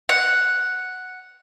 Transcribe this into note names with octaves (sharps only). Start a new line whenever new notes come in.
F#5